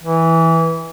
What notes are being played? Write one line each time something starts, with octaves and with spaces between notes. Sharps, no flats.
E3